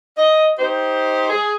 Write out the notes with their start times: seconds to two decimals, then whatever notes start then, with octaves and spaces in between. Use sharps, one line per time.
0.17 D#5
0.58 D#4 G4 C5
1.29 G#4